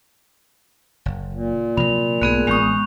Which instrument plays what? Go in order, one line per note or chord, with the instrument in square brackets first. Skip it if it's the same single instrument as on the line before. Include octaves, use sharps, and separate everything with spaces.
[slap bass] F#1
[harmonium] A#2
[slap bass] C3 F3 F#3 [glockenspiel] B5 F7
[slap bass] B1 G#2 [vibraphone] A3 B3 G#4 [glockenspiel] F#6
[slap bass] A1 A2 [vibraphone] G#3 B3 D#6 [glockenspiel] C#6 G6 F7